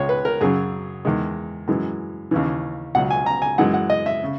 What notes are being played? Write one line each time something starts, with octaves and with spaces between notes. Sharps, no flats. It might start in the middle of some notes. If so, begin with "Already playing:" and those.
Already playing: C#2 C#3 G#3 C#5
B4
A#4
F#2 C#3 F#3 G#4
E2 D#3 G#3
F#2 E3 G#3
D#2 C#3 E3
C#2 B2 F#3 F#5
G#5
A#5
G#5
F#2 E3 G#3 F#5
F#5
D#5
E5
C#3